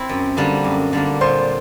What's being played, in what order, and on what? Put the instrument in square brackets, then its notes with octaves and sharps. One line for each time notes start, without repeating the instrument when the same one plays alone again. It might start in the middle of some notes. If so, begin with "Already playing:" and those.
Already playing: [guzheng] C4 E4
F#2
D3 G3 A#3 D4
F#2
D3 G3 A#3 D4
[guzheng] A#2 [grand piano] C5 C6